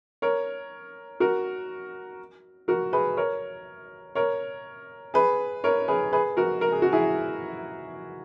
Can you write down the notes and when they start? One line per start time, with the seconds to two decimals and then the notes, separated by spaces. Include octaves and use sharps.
0.22 A#4 C#5
1.20 F#4 A#4
2.68 F#4 A#4
2.93 G#4 B4
3.17 A#4 C#5
4.15 A#4 C#5
5.14 G#4 B4
5.64 A#4 C#5
5.88 G#4 B4
6.13 G#4 B4
6.37 F#4 A#4
6.61 A#4
6.72 G#4
6.82 F#4
6.92 E4 G#4